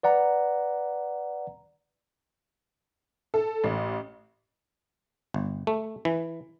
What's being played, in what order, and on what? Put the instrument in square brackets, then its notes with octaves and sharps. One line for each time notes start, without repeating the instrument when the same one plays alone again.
[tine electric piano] B4 D5 F#5 A#5
[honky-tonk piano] A4
A1
[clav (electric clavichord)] G1
A3
E3